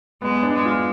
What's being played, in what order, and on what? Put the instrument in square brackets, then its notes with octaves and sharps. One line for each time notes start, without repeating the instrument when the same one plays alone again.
[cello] G#3 [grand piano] B3
[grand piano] D4
[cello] G#3
[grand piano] F4